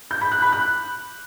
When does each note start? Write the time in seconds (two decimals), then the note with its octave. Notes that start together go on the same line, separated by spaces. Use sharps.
0.11 G6
0.21 B5
0.32 F#6
0.42 B5
0.52 F#6